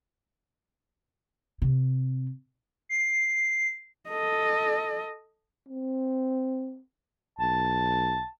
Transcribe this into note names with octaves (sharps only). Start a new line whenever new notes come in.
C3
C7
A4 D#5
C4
B1 A5